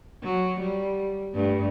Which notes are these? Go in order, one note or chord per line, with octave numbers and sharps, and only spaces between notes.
F#3
G3
G2 A3